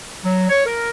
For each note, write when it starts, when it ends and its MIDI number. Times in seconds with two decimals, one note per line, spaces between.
0.22 0.46 54
0.49 0.62 73
0.65 0.90 70